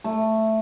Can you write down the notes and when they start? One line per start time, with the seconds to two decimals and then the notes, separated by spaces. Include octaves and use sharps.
0.04 A3